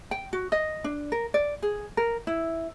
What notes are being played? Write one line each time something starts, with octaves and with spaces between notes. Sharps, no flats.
G5
F#4
D#5
D4
A#4
D5
G#4
A#4
E4